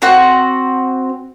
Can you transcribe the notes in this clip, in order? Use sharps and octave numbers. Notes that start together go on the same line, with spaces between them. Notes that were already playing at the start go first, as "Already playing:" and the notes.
C4 F#4 F#5